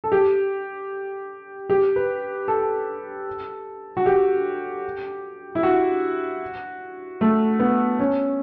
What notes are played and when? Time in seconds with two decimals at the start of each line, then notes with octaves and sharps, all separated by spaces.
0.04 A4
0.12 G4
1.70 G4
1.96 B4
2.48 A4
3.97 F#4
4.06 G4
5.55 E4
5.63 F#4
7.21 A3
7.59 B3
7.99 C#4